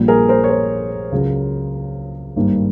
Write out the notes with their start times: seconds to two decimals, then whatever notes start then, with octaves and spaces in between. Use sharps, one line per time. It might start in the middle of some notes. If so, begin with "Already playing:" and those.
Already playing: A#1 A#2 G3 A#3
0.08 G#4 A#4
0.29 A#4 C5
0.44 C#5
0.49 A#4 C5
1.12 C#2 C#3 F#3
2.36 G#1 G2 D#3 G3 A#3